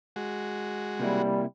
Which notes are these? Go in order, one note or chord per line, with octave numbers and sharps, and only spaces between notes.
G#3 F#4
C3 G3 A#3 E4